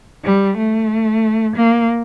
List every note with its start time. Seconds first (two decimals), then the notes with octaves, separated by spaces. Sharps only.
0.24 G3
0.57 A3
1.56 A#3